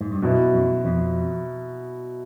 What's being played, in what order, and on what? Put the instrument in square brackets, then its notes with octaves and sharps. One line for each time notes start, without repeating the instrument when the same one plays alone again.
[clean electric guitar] G#2
G2
[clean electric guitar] F#2 [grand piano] B2 F#3 B3 E4
[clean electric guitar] F#2
F2